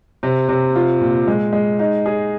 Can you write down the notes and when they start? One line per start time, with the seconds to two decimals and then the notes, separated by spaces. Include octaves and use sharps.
0.23 C3
0.49 C3
0.75 F4
1.01 A#2
1.28 G#3
1.53 G#3
1.79 D#4
2.06 G#4